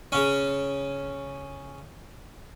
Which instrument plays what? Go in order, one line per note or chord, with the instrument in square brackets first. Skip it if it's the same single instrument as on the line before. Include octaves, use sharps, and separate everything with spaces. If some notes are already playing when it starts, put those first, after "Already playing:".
[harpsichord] C#3 C#4